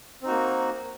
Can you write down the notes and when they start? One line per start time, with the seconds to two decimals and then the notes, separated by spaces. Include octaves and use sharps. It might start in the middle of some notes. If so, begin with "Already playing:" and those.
0.22 C4
0.25 D#4
0.28 F#4
0.30 A#3